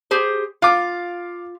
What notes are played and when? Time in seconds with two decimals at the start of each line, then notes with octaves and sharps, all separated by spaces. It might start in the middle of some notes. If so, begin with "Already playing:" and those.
0.11 G4 G#4 C5
0.62 F4 F5 D6